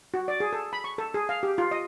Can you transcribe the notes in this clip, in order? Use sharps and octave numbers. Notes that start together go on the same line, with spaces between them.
F#4
D5
G#4
A4
B5
C#6
A4
G#4
F5
G4
F4
D#5